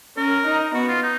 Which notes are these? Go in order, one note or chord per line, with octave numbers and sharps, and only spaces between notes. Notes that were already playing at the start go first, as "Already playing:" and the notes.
C#4 A#4
D#4
B3 F#4
F4
D#4